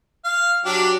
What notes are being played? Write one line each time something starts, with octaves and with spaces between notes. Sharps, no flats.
F5
F#3 D4 G4